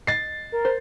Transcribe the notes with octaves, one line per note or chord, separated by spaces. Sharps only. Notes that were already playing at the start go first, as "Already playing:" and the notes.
D#5 A6 C7
A#4
C5